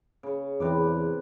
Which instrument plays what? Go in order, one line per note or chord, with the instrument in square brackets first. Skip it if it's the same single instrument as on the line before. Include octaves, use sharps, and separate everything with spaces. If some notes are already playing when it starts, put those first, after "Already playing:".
[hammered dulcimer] C#3
[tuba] E2 [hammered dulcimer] C3 B4 D6